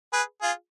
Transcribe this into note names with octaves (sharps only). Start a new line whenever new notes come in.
G#4 B4
F4 G#4